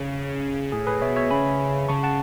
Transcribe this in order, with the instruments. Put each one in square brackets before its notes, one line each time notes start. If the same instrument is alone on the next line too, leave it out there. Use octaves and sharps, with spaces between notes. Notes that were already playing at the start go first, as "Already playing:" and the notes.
Already playing: [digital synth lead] C#3 [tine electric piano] G#4
[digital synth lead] A2 [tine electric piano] G#4
[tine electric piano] G#4 B4
[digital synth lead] B2 [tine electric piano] C#5 E5
[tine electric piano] C#5 E5
[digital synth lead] C#3 [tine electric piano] G#5 B5
[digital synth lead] C#3 [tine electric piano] A5 C#6
[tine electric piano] F#5 A5